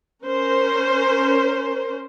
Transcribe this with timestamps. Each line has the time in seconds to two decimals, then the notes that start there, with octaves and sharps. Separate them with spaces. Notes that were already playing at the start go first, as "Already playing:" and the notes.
0.24 C#4 A#4 C5